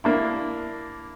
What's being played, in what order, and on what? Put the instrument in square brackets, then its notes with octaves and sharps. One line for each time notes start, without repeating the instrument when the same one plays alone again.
[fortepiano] A#3 D4 E4